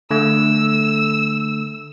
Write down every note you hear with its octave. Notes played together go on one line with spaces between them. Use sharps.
D3 A3 E6